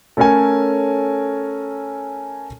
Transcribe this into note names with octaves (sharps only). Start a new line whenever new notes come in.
A3 C#4 A4 A#4 C#5 G#5